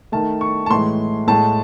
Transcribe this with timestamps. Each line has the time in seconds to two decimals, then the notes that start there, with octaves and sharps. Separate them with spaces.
0.12 D#3 A3 A5
0.41 C#6
0.66 A5
0.70 A2 E3 G#3 C6
1.28 A2 G#3 A5